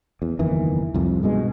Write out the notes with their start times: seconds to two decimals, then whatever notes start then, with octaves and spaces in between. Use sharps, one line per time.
0.22 E2
0.39 F#1 E2 D#3 E3
0.94 C2 F2
1.23 G2 B2 G#3